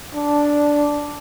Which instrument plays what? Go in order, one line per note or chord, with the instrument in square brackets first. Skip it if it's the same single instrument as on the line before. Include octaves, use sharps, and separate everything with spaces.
[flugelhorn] D4